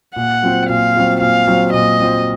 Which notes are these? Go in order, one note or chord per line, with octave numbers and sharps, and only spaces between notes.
A#2 F#5
F#3 C4 F4 C5
A#2 F5
F#3 C4 F4 C5
A#2 F5
F#3 C4 F4 C5
A#2 D#5
F#3 C4 F4 C5